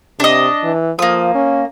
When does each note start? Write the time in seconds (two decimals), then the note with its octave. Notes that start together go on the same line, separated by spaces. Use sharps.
0.20 C3 D4 D#5
0.64 E3
0.99 F3 A#3 D#6
1.35 C#4